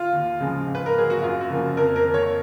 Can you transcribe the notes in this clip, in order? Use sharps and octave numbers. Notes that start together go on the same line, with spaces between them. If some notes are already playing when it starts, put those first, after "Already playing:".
Already playing: F4
D#2
C#3 F3 G#3
G#2
B4
A#4
F#3 A#3 G#4
F#4
F#2 F4
F#4
C#3 F3 A#3
F2 A#4
A#4
D#3 A#3
C#5